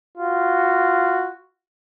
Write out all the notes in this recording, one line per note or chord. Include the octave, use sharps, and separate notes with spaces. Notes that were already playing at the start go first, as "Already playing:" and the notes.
F4 F#4